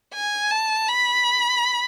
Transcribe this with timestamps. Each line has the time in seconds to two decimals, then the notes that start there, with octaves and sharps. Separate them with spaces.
0.14 G#5
0.51 A5
0.88 B5